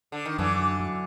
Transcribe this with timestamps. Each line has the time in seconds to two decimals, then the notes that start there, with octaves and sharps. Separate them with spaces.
0.12 D3
0.26 D#3
0.38 F#2 D3 E3
0.59 F#3
0.80 F#3